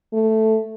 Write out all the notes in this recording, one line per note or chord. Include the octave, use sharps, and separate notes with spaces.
A3